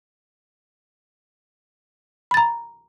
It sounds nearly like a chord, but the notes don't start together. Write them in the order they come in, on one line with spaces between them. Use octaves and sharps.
B5 A6 A#5